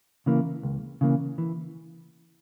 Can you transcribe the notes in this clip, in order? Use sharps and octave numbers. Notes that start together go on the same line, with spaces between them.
C#3 E3 A#3
C#2
C#3 E3 A#3
E3